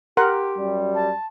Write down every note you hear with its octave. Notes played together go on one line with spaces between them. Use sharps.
G4 A#4 F#5 C6
F#2 G3
A5